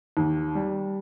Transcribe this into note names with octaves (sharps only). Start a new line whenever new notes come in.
D#2
G3